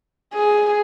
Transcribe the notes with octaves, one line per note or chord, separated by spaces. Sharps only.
G#4